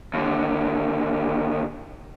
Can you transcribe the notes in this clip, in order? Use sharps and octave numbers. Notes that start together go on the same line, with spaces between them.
D#2 D3